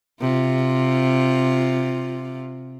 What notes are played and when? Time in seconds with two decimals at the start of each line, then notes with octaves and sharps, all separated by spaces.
0.21 C3 F4